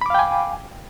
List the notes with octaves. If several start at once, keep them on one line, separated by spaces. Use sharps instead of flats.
F5 G5 G#5 B5 D6